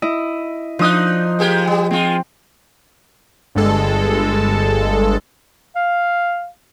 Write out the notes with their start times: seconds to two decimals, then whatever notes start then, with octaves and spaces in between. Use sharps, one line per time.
0.02 E4 D#5
0.79 F3 D4 D#4 D#6 F#6
1.39 G#3 A#3 G4
1.67 G3
1.91 G#3 C4 F4
3.55 G1 G2 G#3 A4
5.75 F5